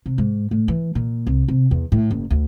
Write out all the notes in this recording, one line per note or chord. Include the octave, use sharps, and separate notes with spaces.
C3
G#2
A2
E3
A#2
C2
C3
E2
A2
F#1
D2